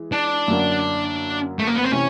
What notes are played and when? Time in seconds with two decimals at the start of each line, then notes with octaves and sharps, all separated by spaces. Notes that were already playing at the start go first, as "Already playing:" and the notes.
Already playing: E3 G#3
0.12 D4
0.48 F#2 D3 F#3 A#3
1.59 A3
1.67 A#3
1.76 B3
1.84 C4
1.92 C3 E3 C#4